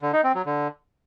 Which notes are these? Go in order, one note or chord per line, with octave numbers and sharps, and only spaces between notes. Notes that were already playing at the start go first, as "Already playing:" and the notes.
D3
D#4
C4
F#3
D3